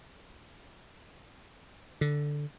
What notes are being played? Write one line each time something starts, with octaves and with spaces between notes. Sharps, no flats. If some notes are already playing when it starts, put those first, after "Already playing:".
D3